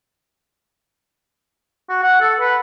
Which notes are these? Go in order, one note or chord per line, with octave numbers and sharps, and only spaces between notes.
F#4
F#5
A4
B4